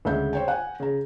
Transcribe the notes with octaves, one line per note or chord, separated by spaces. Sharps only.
D2 C#3 G#3 E5 G6
C5 C#5 G5
F#5 G#5
C#3 A#5